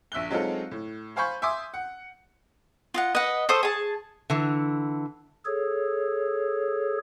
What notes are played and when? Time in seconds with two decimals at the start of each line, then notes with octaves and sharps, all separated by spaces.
0.12 A#1 E5 F#6 G7
0.30 F#3 G#3 C4 D#4 F4 A4
0.71 A2
1.16 C5 F5 G#5 B5 C#6 G6
1.42 E5 G#5 C6 D6 D#6
1.74 F#5
2.94 F4 D#5 F#5
3.15 B4 D#5 F#5
3.49 A4 C5 C#6 D#6
3.63 G#4 A5
4.30 D3 E3
5.46 G#4 A4 C#5